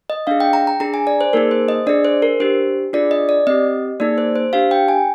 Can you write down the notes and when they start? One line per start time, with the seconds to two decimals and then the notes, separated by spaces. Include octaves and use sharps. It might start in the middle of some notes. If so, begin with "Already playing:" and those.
0.10 D#5
0.27 D4 G#4 F5
0.40 G5
0.53 A#5
0.67 A#5
0.80 D4 G#4 A#5
0.94 G#5
1.07 D5
1.21 C5
1.33 A#3 D#4 G#4 A#4
1.51 C5
1.69 D#5
1.87 D4 G#4 D5
2.05 C5
2.22 A#4
2.40 D4 G4 C5
2.93 D4 F4 G#4 D5
3.11 D#5
3.29 D5
3.47 C4 G4 D#5
4.00 A#3 D#4 G#4 D5
4.18 C5
4.36 C5
4.53 D4 G4 F5
4.71 G5
4.88 G#5